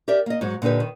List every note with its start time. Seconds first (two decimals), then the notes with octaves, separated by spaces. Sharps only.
0.08 G4 A#4 D5 E5
0.26 A#3 D#5
0.41 G#2 F#3
0.62 A#2 D3 D#4 G4 B4
0.80 D#3